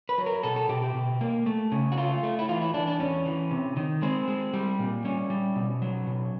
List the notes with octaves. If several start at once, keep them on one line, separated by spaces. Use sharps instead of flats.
B4
F#3
A#4
B2 A4
A4
B2 G4
G4
B2
A#3
A3
C#3
F#4
A3 F4
A3
E4
E3 F4
E4
E3 D4
D4
E2 C#4
E3
C3
D#3
G#3 C4
G#3
G3
A#2
G3 C#4
G3
B2
F#3
B2